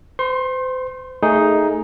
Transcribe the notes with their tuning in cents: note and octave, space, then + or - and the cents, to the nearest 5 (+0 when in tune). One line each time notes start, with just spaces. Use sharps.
C5 -35 C6 +30
A3 +15 D#4 +5 G#4 +0